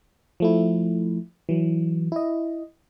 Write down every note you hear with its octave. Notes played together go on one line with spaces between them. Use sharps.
F3 A3 E4
E3 F#3
E4 D#5